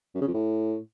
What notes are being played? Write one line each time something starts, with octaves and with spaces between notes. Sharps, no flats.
F#2
C#3
F2
A2